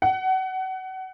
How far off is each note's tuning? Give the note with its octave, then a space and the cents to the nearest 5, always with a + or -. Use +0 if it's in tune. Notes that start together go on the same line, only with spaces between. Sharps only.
F#5 +30